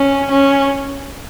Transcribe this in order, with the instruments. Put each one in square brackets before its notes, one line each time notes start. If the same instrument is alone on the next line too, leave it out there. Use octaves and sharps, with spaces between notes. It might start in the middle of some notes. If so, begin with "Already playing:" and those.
Already playing: [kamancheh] C#4
C#4